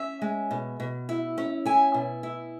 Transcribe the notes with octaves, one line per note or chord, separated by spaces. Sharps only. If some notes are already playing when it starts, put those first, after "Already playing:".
Already playing: C#4 E5
G#3
B2
B2
E4
C#4
E4 G#5
B2
E4